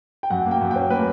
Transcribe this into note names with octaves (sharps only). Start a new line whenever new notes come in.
G5
F#2 F#5
A#3
G5
F#2
C#4 G5
A#3 B4